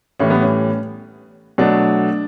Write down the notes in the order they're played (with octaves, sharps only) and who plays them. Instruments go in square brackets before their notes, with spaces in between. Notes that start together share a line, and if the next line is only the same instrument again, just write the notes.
[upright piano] A2 E3 G3 C#4
B3
C#4
B2 F#3 A3 D4